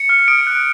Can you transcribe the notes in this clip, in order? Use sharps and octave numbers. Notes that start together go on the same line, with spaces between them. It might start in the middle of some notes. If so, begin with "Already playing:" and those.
Already playing: C#7
F6
D#6 D7
F#6